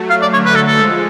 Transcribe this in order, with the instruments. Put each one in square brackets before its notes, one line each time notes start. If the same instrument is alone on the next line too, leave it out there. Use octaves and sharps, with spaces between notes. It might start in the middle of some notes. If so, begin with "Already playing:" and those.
Already playing: [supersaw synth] F#3 A3
[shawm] F5
D5
[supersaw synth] D3 F#3 [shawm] C#5
[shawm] B4
A4
A4
[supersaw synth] F3 G#3